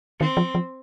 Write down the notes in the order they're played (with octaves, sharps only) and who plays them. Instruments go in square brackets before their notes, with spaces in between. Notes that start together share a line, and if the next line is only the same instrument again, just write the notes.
[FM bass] D#3 [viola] C4
[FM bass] F3
F3